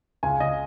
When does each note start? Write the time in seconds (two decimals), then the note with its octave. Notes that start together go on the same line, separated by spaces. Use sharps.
0.23 C#2 G#5
0.40 C#2 D#5